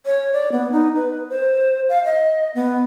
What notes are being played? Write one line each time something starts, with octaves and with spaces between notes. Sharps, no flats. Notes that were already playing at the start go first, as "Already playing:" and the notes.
C#5
D5
B3
D#4
B4
C5
F5
D#5
B3